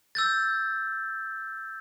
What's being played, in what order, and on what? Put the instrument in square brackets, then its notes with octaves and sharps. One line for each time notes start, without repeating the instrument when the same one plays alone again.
[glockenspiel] E6 G6 A6